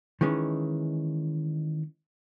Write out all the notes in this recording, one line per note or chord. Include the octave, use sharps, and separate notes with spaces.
D#3 E3 G#3 C#4